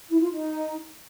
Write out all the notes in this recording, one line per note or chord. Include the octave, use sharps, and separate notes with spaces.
E4
F4
D#4